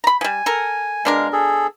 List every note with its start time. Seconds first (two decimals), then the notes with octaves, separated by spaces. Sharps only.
0.04 A#5 B5
0.21 F3 G3 G#5
0.46 A4 A#4
1.05 B2 G#3 D4 A#4 F5
1.33 G#4 A4